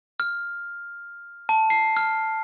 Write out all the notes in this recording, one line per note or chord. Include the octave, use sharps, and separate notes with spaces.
F6
A5
C7
F6